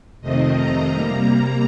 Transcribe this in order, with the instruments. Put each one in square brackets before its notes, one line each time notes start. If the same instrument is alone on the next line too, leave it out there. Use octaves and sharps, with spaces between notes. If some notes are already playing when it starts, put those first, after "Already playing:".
[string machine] F2 C3 D#3 A3 C4 D#5
A#5
C3 G3 A#3